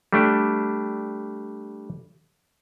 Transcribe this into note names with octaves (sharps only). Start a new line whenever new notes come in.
G3 A3 D4